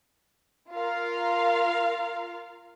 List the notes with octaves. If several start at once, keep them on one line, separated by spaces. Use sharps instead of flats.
F4 A#4 F5